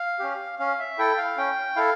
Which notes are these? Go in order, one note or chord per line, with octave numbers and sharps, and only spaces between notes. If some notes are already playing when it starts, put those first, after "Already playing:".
Already playing: F5
C#4 G4
C#4 F5
E5
E4 A4 G5
F5
C#4 G5
E4 A4 F5